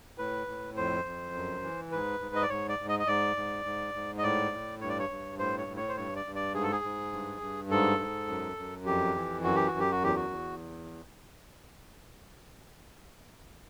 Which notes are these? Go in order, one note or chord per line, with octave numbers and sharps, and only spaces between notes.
A2 B4
A2
F2 C5
F2
F#2
E3
G#2 B4
G#2
D#5
D5
G#2 C#5
D5
G#2
D#5
D#5
G#2 D5
G#2
G#2
G#2
D#5
A2 D5
A2
G2 C#5
D5
C#5
G2
A2 C5
C#5
A2
C#5
C5
G2 C#5
D5
G2
D5
G#2 G#4
A4
G#4
G#2
G2
G2
G#2 A4
G#2
F#2
F#2
F2 G4
E3
F#2 F#4
G4
F#4
F#2
G4
F#4
E2 G4
F#4
E2